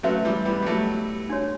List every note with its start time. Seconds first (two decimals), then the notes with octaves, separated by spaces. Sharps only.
0.03 F#3 A3 C#4 F#4 B4 E5
0.25 E3 G3
0.45 G3 B3
0.62 G3
0.66 F#3 A3
1.30 D4 F#4 C#5